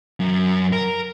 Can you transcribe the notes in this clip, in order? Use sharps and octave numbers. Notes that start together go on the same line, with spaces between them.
F#2
A#4